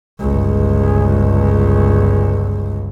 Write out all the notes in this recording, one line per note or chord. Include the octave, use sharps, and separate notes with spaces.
G1 C#2